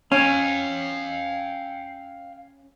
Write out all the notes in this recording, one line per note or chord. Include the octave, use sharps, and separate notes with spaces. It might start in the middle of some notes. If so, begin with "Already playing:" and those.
C#4 F5 G5